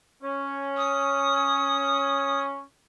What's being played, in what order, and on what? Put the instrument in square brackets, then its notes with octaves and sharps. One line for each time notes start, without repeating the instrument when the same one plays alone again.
[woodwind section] C#4
[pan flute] D#6